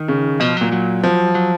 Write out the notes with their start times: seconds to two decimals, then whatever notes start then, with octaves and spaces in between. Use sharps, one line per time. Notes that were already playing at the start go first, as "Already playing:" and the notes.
Already playing: D#3
0.08 C#3
0.40 B2 F3
0.57 A#2 F#3
0.72 F#3
1.04 F3
1.35 F#3